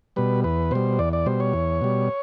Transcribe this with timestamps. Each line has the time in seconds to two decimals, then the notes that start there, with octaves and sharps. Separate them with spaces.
0.16 B2 G3 B4
0.44 E2 B4
0.71 B2 G3 C5
0.99 E2 D5
1.13 D5
1.26 B2 G3 C5
1.40 C#5
1.53 E2
1.82 B2 G3